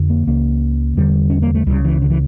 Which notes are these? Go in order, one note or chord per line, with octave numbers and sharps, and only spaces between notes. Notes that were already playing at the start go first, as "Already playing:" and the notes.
Already playing: F2 D3
A#3
C#2 C#3 A#3
E2 D3 G3
C#4
A#3
A3
C#2 C#3 G3
E3
D3
E3